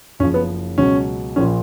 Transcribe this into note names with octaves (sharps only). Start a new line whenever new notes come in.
F#1 F#2 C#3 F3 C#4
B3
C#2 B2 F#3 C#4
A#1 A#2 F3 C#4